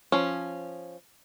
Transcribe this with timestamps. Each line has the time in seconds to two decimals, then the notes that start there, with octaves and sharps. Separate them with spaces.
0.12 F3 C#4